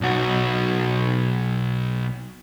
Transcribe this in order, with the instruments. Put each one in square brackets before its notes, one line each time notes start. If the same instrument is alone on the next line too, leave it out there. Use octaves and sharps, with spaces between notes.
[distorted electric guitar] B1 F#4